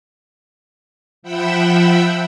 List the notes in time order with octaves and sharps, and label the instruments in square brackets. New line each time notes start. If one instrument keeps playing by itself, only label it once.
[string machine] F3 E5 F#5 G5 B5 E6